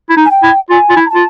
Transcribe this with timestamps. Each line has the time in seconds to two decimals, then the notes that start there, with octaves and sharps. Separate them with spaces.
0.10 E4
0.17 D#4
0.25 G#5
0.30 G5
0.43 E4
0.70 F4 G#5
0.90 F4
0.96 E4
1.06 A#5
1.10 F4 A5